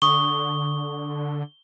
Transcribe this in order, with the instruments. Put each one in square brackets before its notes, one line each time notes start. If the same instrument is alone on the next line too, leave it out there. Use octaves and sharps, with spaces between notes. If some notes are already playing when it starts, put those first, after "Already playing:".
[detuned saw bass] D3 [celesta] C#6 D#6 [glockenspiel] G7